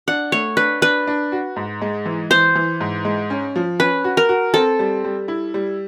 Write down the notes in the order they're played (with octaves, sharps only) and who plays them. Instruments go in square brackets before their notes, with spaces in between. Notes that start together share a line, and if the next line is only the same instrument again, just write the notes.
[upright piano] D4 [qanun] F#5
[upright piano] A3 [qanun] C#5
[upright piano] D4 [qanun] B4
[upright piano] D4 [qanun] B4
[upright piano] D4
F#4
G#2
G#3
E3
[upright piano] E3 [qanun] C5
[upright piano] E3
G#2
G#3
C#4
F3
[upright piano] C#4 [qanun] B4
[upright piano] F#4
[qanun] A#4
[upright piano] F#4
[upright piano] C4 [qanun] A4
[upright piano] G3
G3
E4
G3